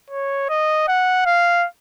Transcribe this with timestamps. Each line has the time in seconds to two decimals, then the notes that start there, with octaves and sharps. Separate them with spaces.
0.10 C#5
0.49 D#5
0.88 F#5
1.26 F5